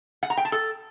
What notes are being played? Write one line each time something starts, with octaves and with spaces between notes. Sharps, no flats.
F#5
A#5
G5
A5
A4